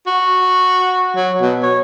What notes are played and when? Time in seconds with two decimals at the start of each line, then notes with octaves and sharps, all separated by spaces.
0.07 F#4
1.15 F#3
1.41 B2
1.63 C#5